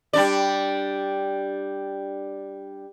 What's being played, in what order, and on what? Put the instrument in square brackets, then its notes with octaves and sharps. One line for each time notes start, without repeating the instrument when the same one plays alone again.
[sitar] G3 D4 D5